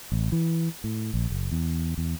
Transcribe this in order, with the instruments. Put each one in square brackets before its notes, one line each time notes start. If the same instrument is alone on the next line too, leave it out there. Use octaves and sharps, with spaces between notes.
[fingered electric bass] A1
E3
A2
A#1
F#1
E2
E2